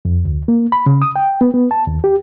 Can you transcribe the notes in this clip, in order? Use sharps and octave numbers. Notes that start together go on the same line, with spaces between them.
F2
D2
A#3
B5
C#3
D#6
G5
B3
B3
A5
D#2
G4